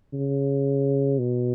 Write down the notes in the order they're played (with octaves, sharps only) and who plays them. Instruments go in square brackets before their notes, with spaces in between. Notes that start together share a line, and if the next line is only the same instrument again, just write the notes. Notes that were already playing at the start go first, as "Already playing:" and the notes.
[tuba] C#3
B2